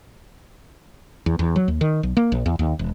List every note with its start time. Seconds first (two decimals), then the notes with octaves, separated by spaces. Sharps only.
1.26 E2
1.39 E2
1.56 F#3
1.68 D#2
1.81 D#3
2.03 B1
2.17 A#3
2.32 A#1
2.46 E2
2.59 D#2
2.79 E1